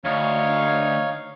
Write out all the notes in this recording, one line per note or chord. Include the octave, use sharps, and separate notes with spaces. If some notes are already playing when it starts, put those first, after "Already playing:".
D2 D#4 C#5 F5